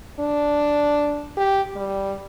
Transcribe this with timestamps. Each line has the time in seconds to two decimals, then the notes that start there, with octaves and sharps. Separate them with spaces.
0.20 D4
1.37 G4
1.76 G3